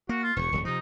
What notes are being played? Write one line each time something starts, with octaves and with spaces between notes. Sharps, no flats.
A#3 F#4
F4
E1 E2 C#6
D1 F#3
C3 F3 D#4